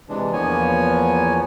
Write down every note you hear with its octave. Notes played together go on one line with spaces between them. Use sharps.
C3 E3 G#3 D4
E2 F3 A#3 B3 C#5 G#5